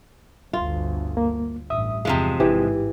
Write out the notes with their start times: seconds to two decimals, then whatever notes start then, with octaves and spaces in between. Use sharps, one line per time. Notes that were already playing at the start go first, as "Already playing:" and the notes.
0.53 G1 D2 F4
1.17 A#3
1.70 A1 G2 E5 D#6
2.05 E2 G2 C3 F3 G#3 F5
2.40 A1 G#2 E3 G4